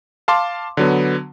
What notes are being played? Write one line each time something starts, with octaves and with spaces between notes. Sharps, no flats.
F5 A5 C6 D6
D3 F#3 B3